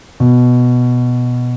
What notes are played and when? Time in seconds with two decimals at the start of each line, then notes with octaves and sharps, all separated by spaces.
0.20 B2